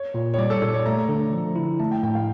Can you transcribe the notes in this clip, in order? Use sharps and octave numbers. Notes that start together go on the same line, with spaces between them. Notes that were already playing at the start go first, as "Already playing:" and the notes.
Already playing: C#5
A#2
C#5
G3 D5
A4
A#2 A4
C#5
A3 A#5
D3
F3
E4
A3 A5
G5
A2 G5
F5